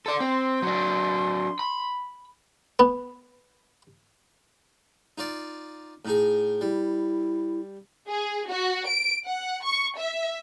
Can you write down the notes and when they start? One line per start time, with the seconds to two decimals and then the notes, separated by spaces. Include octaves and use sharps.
0.06 A4 D5 C6
0.20 C4
0.62 F#3 D4
1.59 B5
2.79 B3
5.18 D#4 F4 D5
6.05 A2 D#4 G#4
6.61 G3 E4
8.09 G#4
8.50 F#4
8.88 D7
9.25 F#5
9.64 C#6
9.97 E5